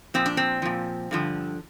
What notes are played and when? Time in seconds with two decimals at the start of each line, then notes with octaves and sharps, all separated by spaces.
0.14 A#2 F3 C4
0.26 D4
0.37 C4
0.62 A#2 F3
1.11 G2 D3 F3